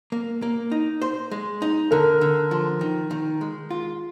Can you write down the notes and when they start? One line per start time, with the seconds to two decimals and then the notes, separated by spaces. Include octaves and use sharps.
0.12 A#3
0.42 A#3
0.72 D#4
1.02 C5
1.31 G#3
1.62 D#4
1.91 D3 A#4
2.21 D3
2.51 F3
2.81 D#3
3.11 D#3
3.41 G#3
3.70 F4